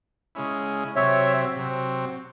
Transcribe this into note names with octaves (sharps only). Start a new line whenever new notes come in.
C#3 G#3 C#4 E4
C3 F#3 C4 C#5 E5
C3 F#3 C4